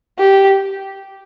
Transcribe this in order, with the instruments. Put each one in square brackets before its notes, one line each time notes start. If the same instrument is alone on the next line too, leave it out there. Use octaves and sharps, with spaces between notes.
[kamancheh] G4